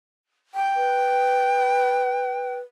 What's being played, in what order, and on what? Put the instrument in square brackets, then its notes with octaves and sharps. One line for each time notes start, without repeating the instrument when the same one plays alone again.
[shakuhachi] G5
[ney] B4